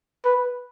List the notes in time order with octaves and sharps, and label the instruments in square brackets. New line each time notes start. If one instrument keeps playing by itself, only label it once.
[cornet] B4